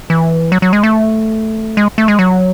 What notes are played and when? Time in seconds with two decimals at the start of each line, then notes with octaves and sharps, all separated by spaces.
0.10 E3
0.52 F#3
0.62 F#3
0.73 G#3
0.83 A3
1.77 G#3
1.98 A3
2.08 G#3
2.19 F#3